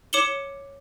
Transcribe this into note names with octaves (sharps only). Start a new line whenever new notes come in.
C#5 D6 C#7 E7 F#7 G7